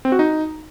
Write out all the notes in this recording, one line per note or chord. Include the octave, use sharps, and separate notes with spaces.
C4
F#4
D#4